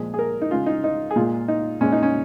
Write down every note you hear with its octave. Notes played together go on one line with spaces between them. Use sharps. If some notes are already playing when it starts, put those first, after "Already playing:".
Already playing: A#2 F3 G#3 G#4
G#4
A#4
D#4
C#3 G#3 F4
D#4
D#4
G#4
A#2 G#3 F4
D#4
A#2 G#3 C#4
D#4
C#4